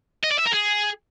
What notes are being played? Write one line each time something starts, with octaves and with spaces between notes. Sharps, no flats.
D#5
D5
E5
A#4
G#4